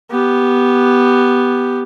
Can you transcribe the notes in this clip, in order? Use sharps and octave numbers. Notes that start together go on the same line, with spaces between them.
B3 G4